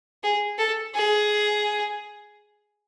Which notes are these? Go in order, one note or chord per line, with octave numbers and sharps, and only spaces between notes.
G#4
A4
G#4